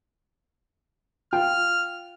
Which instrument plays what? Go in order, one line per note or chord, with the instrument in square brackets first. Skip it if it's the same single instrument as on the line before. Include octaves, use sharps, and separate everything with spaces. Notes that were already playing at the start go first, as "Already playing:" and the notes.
[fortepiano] F4 G5 [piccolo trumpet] F6